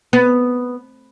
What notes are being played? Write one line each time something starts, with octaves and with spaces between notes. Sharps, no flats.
B3